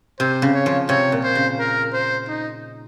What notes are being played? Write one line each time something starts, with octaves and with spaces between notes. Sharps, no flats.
C3 C5
C#3
C#5
F3
C3 C#5
A#2
C5
C#3
A#4
C5
D#4